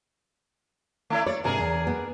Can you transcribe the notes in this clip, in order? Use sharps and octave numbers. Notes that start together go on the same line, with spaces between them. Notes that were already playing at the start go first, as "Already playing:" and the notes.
A3 E4 D5
C#5 D5
G#2 C3 D4 G#4 A#4
E2
B3